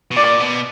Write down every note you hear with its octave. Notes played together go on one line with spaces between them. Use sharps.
B2
A#2 D5
B2